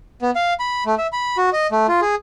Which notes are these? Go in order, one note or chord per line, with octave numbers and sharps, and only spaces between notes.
B3
F5
B5
A3
E5
B5
F#4
D#5
A3
F4
G#4